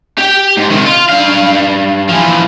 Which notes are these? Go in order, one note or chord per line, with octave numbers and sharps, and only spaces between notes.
G4 G5
G#2
C3 D#3
F4
G2 F5
E3 F3